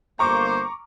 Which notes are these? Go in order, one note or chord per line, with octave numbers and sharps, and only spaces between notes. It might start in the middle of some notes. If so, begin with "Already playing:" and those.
G1 A#3 C5 A#5 C#6 D6